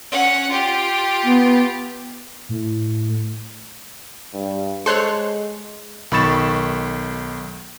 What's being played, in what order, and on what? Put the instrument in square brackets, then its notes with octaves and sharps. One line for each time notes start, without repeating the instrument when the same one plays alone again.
[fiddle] C#4 F#5
F4 G4
[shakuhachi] B3
[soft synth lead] A2
[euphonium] G2
[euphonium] G#3 [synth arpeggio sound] A4 C5 C#5 [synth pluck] C6 F#6
[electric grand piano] B1 D#3 B5 C#6 A6 E7